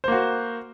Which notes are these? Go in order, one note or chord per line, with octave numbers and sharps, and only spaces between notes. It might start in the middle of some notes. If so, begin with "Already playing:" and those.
A#3 F#4 C5